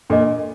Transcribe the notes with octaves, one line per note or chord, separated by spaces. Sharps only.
A#2 D4 A4 D#5